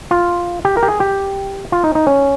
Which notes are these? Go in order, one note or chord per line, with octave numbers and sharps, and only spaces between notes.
F4
G4
A#4
G4
G#4
G4
F4
D#4
D#4
C#4